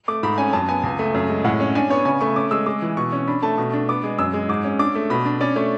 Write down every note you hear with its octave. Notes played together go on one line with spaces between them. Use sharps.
A3 D6
G#2 B5
C#4 G#5
F#2 A5
B3 G#5
C#2
A3
F#2
G#3
A2 F#5
C#4
D4 G#5
B3 C#5
C#3 G#5
A3 C#6
C#4 D6
G#3 E6
G#3 D6
E3
B2 C#6
C#4
D4 B5
A3 A5
B2
D4
B3 D6
G#3
F#2 E6
G#3
G#2 D6
C#4
D4 D6
A3
B2 B5
D4
C#4 D5
A3 C#5